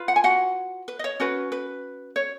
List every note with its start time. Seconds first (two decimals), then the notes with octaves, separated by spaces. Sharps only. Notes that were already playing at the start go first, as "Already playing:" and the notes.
Already playing: F4 B4
0.08 F#5
0.16 G#5
0.24 F#4 F#5
0.88 B4
0.99 D#5
1.04 C#5
1.20 C#4 F#4 B4
1.52 B4
2.16 C#5